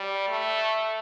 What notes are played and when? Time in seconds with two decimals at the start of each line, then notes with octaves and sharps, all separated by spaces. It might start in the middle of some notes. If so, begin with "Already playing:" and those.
Already playing: G3
0.28 A3